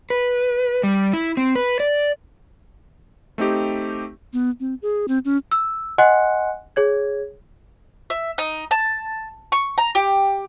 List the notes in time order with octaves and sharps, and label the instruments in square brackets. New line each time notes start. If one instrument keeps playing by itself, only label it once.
[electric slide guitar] B4
G3
E4
C4
B4
D5
[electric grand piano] A3 C4 D#4 G4
[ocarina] B3
C4
G#4
C4
C#4
[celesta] E6
D#5 F#5 G#5 C6 F#6 C#7
G#4 C#5 G#6
[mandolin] E5
D#4
A5
C#6
A#5
G4